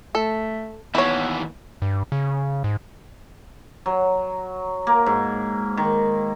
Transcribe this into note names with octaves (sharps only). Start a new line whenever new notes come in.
A3 A4
D#2 E3 B3 E4 C#5
G2
C#3
G#2
F#3
A#3
G#2
D#3